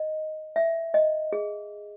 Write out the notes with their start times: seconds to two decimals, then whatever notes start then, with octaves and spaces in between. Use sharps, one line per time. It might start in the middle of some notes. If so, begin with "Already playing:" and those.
Already playing: D#5
0.56 E5
0.94 D#5
1.33 G#4